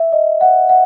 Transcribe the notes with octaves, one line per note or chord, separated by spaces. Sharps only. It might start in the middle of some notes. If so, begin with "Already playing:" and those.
Already playing: E5
D#5
F#5
F#5